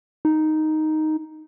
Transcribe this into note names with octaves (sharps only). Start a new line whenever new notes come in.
D#4